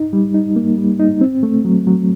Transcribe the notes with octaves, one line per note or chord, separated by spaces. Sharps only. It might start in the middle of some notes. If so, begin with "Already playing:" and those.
Already playing: D#4
G3
D#4
A#3
G3
D#4
C4
A3
F#3
F#3